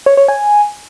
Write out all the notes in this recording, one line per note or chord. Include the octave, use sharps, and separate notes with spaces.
C#5
C#5
G#5